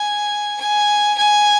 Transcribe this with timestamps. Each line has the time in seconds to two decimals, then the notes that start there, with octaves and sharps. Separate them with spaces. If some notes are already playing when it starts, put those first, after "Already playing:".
Already playing: G#5
0.60 G#5
1.18 G#5